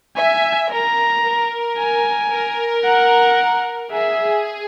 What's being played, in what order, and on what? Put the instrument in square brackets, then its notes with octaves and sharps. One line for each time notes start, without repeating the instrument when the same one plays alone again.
[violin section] E5 [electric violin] G#5
[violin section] A#4 [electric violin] A#5
[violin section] A#4
[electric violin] G#5
[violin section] A#4
[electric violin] F#5
[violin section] G#4 [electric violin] E5